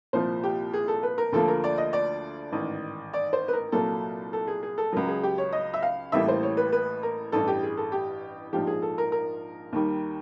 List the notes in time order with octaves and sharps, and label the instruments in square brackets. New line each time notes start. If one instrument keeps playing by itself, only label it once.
[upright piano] C2 A#2 F3 C5
G4
G#4
A4
B4
A#4
D2 D3 F3 A#3 A4
A#4
D5
D#5
D5
A1 G#2 D#3
D5
C5
B4
A#4
C2 A#2 F#3 A#3 A4
A4
G#4
G#4
A4
C#2 C#3 F#3 A#4
G#4
G4
C#5
D#5
E5
F5
A1 A2 E3 G3 A#3 E5
C5
C#5
B4
B4
A#4
A1 G2 E3 A4
G4
G#4
A4
G4
A#1 G#2 F3 G4
G#4
A4
A#4
A#4
D#2 D#3 G3